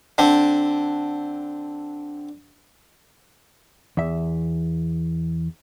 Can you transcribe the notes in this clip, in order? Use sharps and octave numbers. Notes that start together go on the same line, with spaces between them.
D3 C4
E2 E5